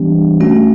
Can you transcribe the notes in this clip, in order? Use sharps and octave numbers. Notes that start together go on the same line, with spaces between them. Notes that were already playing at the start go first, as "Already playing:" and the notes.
Already playing: E3 G3 B3 D4 G4
A3 C#4 F#4